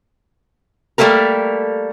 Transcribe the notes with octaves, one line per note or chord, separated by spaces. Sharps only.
G3 A3 A#3 A4 A#4